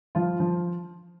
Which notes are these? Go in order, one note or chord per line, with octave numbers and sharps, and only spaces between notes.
F3 F4
F3